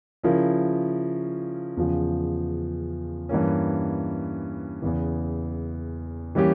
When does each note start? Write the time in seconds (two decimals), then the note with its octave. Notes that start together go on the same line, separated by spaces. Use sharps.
0.23 C#3 F3 C#4 E4 A#4
1.77 E2 C#3 F3
3.29 G2 E3 A#3 C#4
4.82 E2 C#3 E3
6.35 E3 G3 A#3 C#4 G4